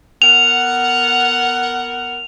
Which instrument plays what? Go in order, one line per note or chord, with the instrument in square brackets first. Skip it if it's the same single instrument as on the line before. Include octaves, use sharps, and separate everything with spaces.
[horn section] B3 A#4 F#5 [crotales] F7